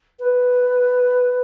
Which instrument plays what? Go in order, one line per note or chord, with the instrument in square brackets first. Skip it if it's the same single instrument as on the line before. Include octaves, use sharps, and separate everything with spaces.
[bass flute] B4